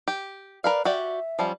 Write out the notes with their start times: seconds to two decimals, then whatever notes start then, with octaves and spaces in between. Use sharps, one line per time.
0.08 G4
0.64 A#4 B4 D5 F5
0.85 F#4 G4 D5 E5
1.39 F3 G3 C#4